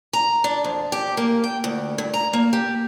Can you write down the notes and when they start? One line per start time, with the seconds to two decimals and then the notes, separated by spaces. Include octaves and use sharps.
0.13 A#5
0.44 D4
0.64 F2
0.92 G4
1.17 A#3
1.44 G5
1.64 D2
1.98 G2
2.14 A#5
2.33 A#3
2.53 G4